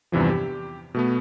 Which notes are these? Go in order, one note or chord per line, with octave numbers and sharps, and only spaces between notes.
E2 G2 C3 E3 F3
G4
B2 A3 B3